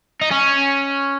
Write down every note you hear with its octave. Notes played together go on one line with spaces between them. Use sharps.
D#4
C#4